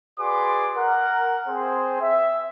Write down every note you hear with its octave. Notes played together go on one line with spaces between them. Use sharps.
F#4 G#4 B4 D5 C6 D6
A#4 F#5
C4 G#4 C5
E5